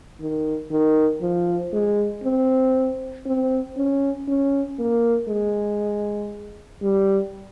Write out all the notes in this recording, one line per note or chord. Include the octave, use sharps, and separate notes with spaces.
D#3
D#3
F3
G#3
C4
C4
C#4
C#4
A#3
G#3
G3